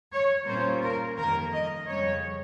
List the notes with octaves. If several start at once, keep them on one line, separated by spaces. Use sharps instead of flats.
C#5
A#2 G3 A#3 C#4 F4 C5
A#4
F2 D#3 G3 A#3 A#4
D#5
F2 C#3 G3 C#5